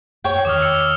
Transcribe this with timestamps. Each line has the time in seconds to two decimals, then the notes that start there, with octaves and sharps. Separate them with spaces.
0.24 F#2 C#5 G5
0.45 E2 D#3 D6 D#6 F6
0.60 E6 C#7